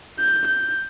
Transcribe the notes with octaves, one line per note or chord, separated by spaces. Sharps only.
G6
G6